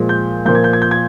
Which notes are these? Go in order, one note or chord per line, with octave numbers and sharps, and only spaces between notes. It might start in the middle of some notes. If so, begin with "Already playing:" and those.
Already playing: A#2 F3 G#3
G6
A#2 F3 A#3 G6
G#6
G6
G#6
G6
G#6